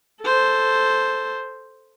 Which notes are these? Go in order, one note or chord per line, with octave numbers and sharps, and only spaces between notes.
A4 C5